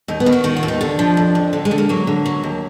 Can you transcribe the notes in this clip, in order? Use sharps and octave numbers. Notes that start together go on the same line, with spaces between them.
D#2 D#4
B3
D#3
F#4
D#3 F#4
F4
D#2
D#4
D3 D4
F3
F2
F2
D3
G#3
D3
A#3
F#3 A#3
D3
F#3
D#2